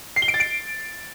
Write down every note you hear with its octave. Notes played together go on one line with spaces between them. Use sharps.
C7
G7
D7
A6
D7